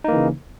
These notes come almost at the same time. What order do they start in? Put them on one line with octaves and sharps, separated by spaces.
D#4 A#3 E3 C#3